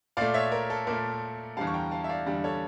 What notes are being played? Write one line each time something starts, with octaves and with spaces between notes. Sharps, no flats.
A#2 A3 D5 F5
C#5 E5
A#4
A4
A#2 A3 A#4
E2 D3 G3 F5 A5
C#6
G5 A#5
F5 A5
E5
D5 F5
E2 D3 G3
A4 C#5